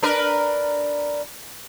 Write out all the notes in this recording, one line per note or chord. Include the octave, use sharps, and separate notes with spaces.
D4 A#4 B4